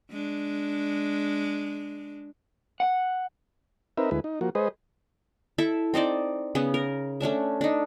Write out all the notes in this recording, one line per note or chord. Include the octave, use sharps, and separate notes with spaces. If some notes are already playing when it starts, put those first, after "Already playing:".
G#3 D4
F#5
C4 D#4 A#4 B4 E5
D2 G#3 E4 B4
D#4
F3 A#3 F#4
G#3 G#4 B4 C5 D#5
E4 A4 E5
C4 D#4 C5 D5
C#3 B3 C#4
A#4
A3 C#4 D4 E5
D4 D#4